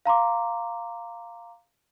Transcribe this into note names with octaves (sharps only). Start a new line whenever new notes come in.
F5 A#5 C6 D6